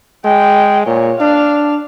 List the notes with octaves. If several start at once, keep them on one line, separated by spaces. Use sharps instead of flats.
G#3 G5
A#2 C#5
D4 F5